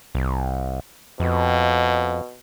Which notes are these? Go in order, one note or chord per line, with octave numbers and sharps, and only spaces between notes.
C2
F2 B2